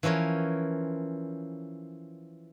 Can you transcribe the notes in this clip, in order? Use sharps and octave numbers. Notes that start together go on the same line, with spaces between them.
E3 F3 C#4 A#4 C#5